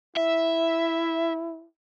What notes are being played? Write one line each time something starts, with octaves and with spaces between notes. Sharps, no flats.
E4 E5